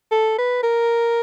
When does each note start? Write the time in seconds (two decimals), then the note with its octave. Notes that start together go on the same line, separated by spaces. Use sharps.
0.11 A4
0.38 B4
0.63 A#4